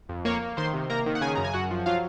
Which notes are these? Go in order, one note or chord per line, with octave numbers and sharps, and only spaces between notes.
F2
A#3 C#5 C#6
A#3
D#3 C5 C6
C3
A#3 A#4 A#5
D#3
F#5
C#3 G#4 G#5
F#2 A#5
G#5
F#2 F#4 F#5
F3
F#3 F4 F5